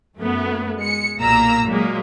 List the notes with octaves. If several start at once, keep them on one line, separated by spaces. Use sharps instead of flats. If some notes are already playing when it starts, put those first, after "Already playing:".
F#2 A3 B3
G#3 C#7
B1 A#2 A#3 A#5 E6
A#2 F#3 G#3 A#3